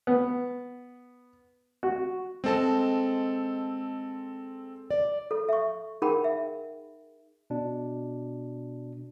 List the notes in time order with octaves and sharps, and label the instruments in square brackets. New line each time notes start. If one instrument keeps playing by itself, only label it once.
[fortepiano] B3
F#4
[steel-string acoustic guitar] G#3 D#5 A5 [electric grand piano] C4 A4
[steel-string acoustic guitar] D5
[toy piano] A4
E5 C#6
D#4 G#4 A#4 F#5 G5 B5
E5
[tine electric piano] B2 D4